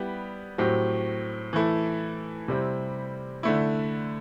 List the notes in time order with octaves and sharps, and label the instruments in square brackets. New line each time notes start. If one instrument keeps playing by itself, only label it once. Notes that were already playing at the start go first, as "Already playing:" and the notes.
Already playing: [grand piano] G3 B3 E4 G4
A2 F#3 C4 G4
E3 A3 E4 A4
C3 G3 C4 E4
D3 A3 E4